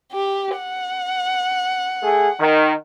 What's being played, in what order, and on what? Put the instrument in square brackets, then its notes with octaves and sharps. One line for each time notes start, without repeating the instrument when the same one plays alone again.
[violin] G4
F#5
[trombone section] A3 G#4
D#3